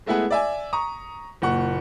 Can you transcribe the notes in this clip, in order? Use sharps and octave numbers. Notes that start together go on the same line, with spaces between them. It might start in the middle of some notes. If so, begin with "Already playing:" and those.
G#3 A3 B3 E4 G#4 F#5
D5 E5 G#5
A#5 C#6 D#6
F#1 A#2 F#5 C#6